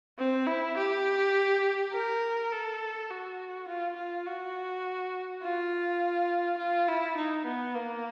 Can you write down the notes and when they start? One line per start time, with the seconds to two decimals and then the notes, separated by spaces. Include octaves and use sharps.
0.19 C4
0.47 E4
0.77 G4
1.93 A#4
2.51 A4
3.10 F#4
3.68 F4
3.96 F4
4.26 F#4
5.43 F4
6.58 F4
6.88 E4
7.17 D#4
7.45 B3
7.75 A#3